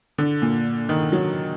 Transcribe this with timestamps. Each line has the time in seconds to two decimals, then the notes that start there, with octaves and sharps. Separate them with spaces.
0.18 D3
0.42 A#2
0.89 D#3
1.12 F#3